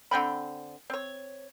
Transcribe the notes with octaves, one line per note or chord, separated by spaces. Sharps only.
D3 C4 G5 B5
C4 C#5